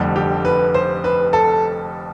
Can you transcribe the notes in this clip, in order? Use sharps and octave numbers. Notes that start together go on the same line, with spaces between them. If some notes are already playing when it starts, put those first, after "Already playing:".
Already playing: F1 F2 D3 G3
G4
B4
C5
B4
A4